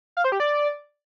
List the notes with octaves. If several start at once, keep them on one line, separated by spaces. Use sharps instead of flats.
F5
C5
G4
D5